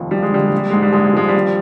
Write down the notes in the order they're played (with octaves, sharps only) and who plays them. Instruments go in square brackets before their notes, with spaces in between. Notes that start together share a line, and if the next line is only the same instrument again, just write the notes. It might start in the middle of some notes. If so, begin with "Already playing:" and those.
Already playing: [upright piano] F1 D#2 F3
F3 G3
G#3
D3 G3
G#3
A#1
G3
G#2 G#3
G3
A#1 G#3
G3
F3 G#3
G3
G#1